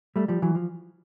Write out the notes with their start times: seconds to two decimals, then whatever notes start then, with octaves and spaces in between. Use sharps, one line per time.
0.16 G3 A3
0.28 F3 G3
0.42 E3 F#3
0.55 F3